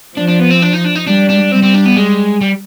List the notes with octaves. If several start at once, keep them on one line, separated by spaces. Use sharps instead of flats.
F3 D4
D4
B3
C4
D4
D#4
D4
D#4
G3 D4
D4
G3 C4
C4
D4
B3
G#3
G3